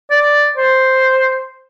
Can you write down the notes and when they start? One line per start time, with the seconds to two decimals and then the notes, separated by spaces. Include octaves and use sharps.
0.11 D5
0.58 C5